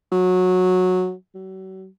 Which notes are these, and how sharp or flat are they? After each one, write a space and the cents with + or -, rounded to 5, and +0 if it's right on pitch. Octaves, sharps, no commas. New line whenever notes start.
F#3 -15
F#3 +40